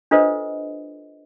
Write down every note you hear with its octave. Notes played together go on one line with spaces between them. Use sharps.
D4 F4 A4 B4 C5 D#5